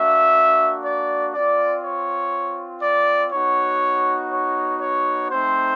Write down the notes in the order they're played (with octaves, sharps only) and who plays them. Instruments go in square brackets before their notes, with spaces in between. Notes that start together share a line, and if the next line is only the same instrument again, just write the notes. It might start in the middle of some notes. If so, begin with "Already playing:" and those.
Already playing: [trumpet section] A#3 D4 F#4 E5
D5
C4 F4 D5
C#5
D5
B3 D#4 F#4 C#5
C#5
C#5
A3 C4 D#4 C5